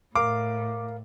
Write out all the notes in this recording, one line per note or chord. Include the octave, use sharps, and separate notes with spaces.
A2 A#4 F5 D6